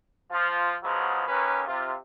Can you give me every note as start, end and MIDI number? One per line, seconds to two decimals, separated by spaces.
0.31 0.72 53
0.31 0.72 65
0.82 1.24 49
0.82 1.24 53
0.82 1.24 54
0.82 1.24 56
0.82 1.24 59
1.28 1.62 39
1.28 1.62 61
1.28 1.62 70
1.28 1.62 71
1.67 1.94 48
1.67 1.94 65